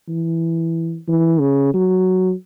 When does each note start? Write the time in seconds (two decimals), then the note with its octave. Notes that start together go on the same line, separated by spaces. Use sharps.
0.09 E3
1.08 E3
1.40 C#3
1.74 F#3